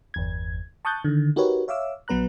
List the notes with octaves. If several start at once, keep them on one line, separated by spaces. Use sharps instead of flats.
G1 E2 G#6
A5 C#6 D#6 F#6 G6 A6
D3 D#3
D#4 F#4 G4 A#4 B4 C#5
C#5 E5 F5 D6 E6
A#1 F#3 B3 B4 A#5 F#6